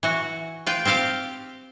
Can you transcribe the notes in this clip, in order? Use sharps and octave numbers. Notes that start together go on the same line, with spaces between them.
E3 F#4
F4 B4 G5
C4 F4 G4 F5 G5